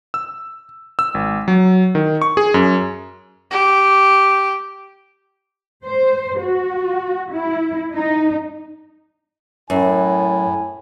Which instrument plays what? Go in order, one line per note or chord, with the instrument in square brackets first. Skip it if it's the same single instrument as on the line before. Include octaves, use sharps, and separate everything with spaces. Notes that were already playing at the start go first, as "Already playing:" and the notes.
[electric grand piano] E6
E6
G#1
F#3
D#3
C#6
G#4
F#2
[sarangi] G4
[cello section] C5
F#4
E4
D#4
[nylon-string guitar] F#2 [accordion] A2 [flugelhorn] G#5